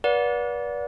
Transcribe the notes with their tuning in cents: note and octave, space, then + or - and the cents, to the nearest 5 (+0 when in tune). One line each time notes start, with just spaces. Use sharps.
B4 -35 D5 -25 F#5 -40